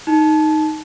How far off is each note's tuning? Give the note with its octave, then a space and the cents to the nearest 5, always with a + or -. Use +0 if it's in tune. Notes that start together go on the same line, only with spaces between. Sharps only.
D#4 +0 A5 -20